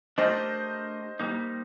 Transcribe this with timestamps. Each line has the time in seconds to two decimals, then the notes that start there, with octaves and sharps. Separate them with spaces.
0.18 A3 D4 G4 A#4 C5 D#5
1.20 G3 A#3 D#4